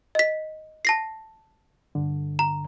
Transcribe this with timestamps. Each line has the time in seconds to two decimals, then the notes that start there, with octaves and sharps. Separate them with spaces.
0.15 D#5 B6
0.85 A5 A#6 C7
1.95 G2 D3
2.39 A#5